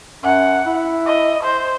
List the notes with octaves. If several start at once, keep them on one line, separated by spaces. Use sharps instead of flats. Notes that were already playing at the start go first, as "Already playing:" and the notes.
F#2 F#5
E4
D#5
C5